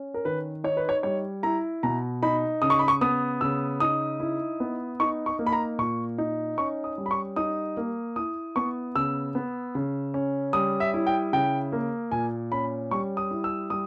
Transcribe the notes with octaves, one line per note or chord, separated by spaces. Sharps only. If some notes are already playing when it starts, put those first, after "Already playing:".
Already playing: C#4
A#4
D#3 B4
D#4 C#5
B4
C#5
G3 C#5
E4 A#5
B2 A#5
D#4 B5
C#3 D#6
C#6
B5
C#6
B3 D#6
C#3 E6
D#4 D#6
E4
B3
D#4 C#6
C#6
A#3
B5
A#5
A#2 C#6
D#4
C#4 C#6
D#6
G3
B5
C#6
D#4 D#6
A#3
E4 D#6
B3 C#6
C#3 E6
B3
C#3
C#4
G3 D#6
E5
E4
G5
C#3 G5
A#3
A#2 G#5
C#4 B5
G3 C#6
D#6
E4
E6
G3 D#6